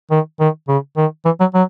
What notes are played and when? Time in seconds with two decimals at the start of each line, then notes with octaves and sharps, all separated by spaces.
0.11 D#3
0.40 D#3
0.68 C#3
0.97 D#3
1.25 E3
1.40 F#3
1.54 F#3